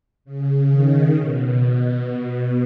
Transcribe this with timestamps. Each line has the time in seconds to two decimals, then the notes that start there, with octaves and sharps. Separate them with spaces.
0.25 C#3
0.69 D#3
1.14 B2
1.59 B2
2.04 B2